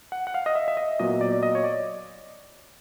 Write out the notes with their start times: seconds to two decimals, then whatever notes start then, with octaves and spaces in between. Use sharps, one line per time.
0.12 F#5
0.27 F#5
0.34 F5
0.46 D#5
0.55 E5
0.68 E5
0.77 D#5
0.99 A#2 F#3 B3 D#5
1.21 D5
1.32 D5
1.43 D#5
1.55 C#5
1.64 D5